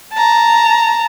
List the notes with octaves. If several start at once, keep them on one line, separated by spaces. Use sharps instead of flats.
A5 A#5